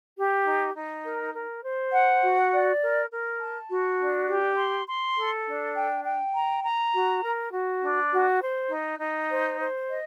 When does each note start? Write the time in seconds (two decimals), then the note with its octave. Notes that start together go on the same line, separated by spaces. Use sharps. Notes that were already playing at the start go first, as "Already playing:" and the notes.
0.16 G4
0.45 D#4
0.75 D#4
1.04 A#4
1.33 A#4
1.63 C5
1.92 F#5
2.21 F#4
2.51 D5
2.81 A#4
3.10 A#4
3.39 A5
3.69 F#4
3.98 D4
4.28 G4
4.58 C6
4.88 C6
5.16 A4
5.46 D4
5.75 G5
6.04 G5
6.35 A#5
6.64 A#5
6.93 F#4
7.22 A#4
7.53 F#4
7.82 D4
8.11 F#4
8.41 C5
8.70 D#4
9.00 D#4
9.29 C5
9.59 C5
9.89 D#5